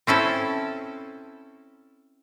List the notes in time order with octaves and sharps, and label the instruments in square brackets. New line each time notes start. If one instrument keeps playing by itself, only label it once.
[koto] C4 C#4 E4 A4